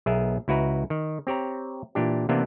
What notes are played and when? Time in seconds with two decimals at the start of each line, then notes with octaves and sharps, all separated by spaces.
0.06 B1 B3 G#4 A#4 E5
0.48 C#2 E4 F#4 B4 A#5
0.90 D#3
1.27 C4 G4 C#5 A#5
1.95 A#2 E3 D4 G4
2.29 C3 E3 A#3 B3 D4